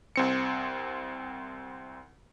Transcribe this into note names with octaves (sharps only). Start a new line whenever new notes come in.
C2 C4 C#7